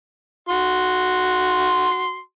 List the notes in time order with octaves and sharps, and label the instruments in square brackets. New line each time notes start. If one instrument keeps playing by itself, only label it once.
[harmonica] F#4 C6